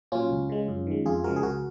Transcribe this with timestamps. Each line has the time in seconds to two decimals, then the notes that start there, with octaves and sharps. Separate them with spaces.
0.12 A#2 F#3 C#4 F4
0.30 C#2
0.49 C#3 G#3
0.68 F#2
0.87 D#3 G#3
1.06 F2 F4 G#4
1.24 C#3 F3 G#3 F#4 A#4
1.36 G#4
1.43 C#2 F#4 A#4